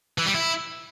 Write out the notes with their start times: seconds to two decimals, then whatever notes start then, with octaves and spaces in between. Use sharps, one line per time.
0.18 E3
0.26 G3
0.34 E4